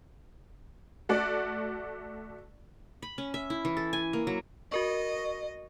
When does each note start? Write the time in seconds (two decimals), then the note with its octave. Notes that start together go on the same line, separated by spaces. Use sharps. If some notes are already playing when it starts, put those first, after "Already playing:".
1.09 A3 F#4 D5
3.02 B5
3.18 C#4
3.34 E5
3.50 E4
3.65 E3
3.77 A4
3.93 G#5
4.13 A#3
4.27 F#3
4.72 F#4 A#4 D#5 C#6